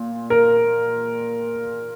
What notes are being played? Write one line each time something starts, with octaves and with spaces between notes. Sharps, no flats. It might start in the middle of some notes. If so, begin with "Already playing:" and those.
Already playing: A#2
A#4